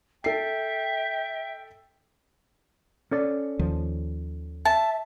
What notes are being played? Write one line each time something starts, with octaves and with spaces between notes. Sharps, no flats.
A4 E5 G5 C7
C#4 A4 D5
D#2 D#3 F3
E5 A5